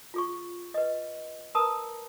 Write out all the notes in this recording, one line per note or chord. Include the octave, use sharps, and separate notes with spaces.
F4 G#4 C#6
B4 D#5
A#4 B4 A5 A#5 D#6